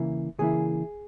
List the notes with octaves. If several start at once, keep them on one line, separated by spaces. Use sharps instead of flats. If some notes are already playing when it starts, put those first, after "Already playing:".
Already playing: C#3 E3 A#3 E4
C#3 E3 A#3 E4 G#4